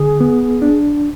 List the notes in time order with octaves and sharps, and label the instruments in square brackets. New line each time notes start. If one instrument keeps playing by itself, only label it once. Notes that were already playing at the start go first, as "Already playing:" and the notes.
Already playing: [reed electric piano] D3 [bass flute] G#4
[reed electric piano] B3
D4